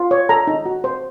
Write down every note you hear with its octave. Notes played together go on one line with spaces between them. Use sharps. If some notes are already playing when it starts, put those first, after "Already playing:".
Already playing: F4
C#5
A4 A#5
D#4
F#4
C5